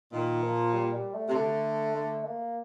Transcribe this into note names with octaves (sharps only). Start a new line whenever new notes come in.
A#2 D#3
F3
G3
G3
A3
C3
D3
A3
A#3